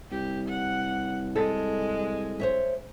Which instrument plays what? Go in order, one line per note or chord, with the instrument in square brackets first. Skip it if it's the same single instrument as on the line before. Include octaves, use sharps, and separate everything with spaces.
[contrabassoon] C2 [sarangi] G4
[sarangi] F#5
[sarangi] G#3 [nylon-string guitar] A4
[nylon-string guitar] C5 C#5 E5